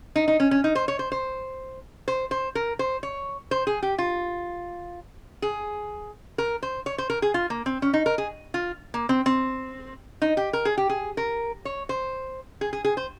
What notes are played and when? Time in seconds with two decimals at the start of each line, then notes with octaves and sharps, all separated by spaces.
0.16 D#4
0.28 D#4
0.40 C#4
0.51 C#4
0.64 D#4
0.75 C5
0.88 C#5
0.99 C5
1.12 C5
2.08 C5
2.31 C5
2.55 A#4
2.79 C5
3.03 C#5
3.51 C5
3.67 G#4
3.82 G4
3.98 F4
5.42 G#4
6.38 A#4
6.63 C5
6.86 C#5
6.98 C5
7.10 A#4
7.22 G#4
7.34 F4
7.50 A#3
7.66 C4
7.82 C#4
7.94 D#4
8.06 A#4
8.18 G#4
8.54 F4
8.94 A#3
9.09 C4
9.26 C4
10.22 D#4
10.37 G4
10.53 A#4
10.65 G#4
10.77 G4
10.89 G#4
11.17 A#4
11.65 C#5
11.89 C5
12.61 G#4
12.73 G#4
12.84 G#4
12.97 C5